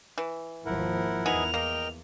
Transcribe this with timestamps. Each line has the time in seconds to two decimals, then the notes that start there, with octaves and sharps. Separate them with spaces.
0.18 E3
0.66 G#1 D#2 F3 E4 A#4 F#5
1.26 E2 B3 D#4 G#4 F7
1.54 A#3 A#4 D#5 G5